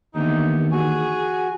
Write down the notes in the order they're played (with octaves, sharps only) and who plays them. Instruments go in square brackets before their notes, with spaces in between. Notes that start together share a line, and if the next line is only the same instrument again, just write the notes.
[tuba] D#2 [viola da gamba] D3 E3 B3 [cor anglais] D#4
[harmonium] F#4 [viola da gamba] G#4 [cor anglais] G#5